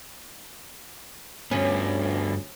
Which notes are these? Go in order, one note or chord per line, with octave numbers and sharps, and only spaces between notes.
D2 G2 B3 C#4